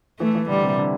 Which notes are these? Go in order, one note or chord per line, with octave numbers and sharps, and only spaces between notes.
E3 A3
E3
D3 G3
C3
D3